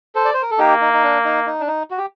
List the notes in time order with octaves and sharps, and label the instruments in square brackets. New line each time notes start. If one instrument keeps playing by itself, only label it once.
[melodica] A4 C5
D5
C5
A#4
A4
[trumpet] A#3 [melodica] D#4 G4
[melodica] D#4
D#4
D4
D#4
D#4
D4
D#4
F#4
G4